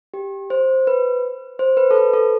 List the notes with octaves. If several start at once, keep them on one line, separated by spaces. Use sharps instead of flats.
G4
C5
B4
C5
B4
A4
B4
A4